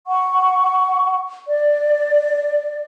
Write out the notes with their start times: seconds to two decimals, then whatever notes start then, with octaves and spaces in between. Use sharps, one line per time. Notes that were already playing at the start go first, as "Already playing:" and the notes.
0.07 F#5 C#6
1.48 D5